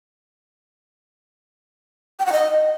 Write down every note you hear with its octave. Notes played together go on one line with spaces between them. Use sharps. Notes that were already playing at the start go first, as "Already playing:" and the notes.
G5
F#5
D#5